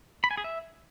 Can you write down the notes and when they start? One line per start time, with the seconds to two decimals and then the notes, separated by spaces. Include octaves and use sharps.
0.24 B5
0.31 G#5
0.37 G#4
0.44 E5